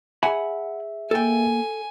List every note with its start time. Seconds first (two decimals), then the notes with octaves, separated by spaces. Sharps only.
0.23 G#4 E5 F#5 G#5 B5
1.11 A#3 A4 G5 G#5